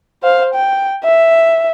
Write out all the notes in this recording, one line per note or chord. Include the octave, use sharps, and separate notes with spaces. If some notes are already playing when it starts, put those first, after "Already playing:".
C5 F5
G5
E5